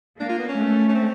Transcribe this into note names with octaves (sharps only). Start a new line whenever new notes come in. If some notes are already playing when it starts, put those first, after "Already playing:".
A#3 D4
F4
B3
C#4
A3
C#4
C4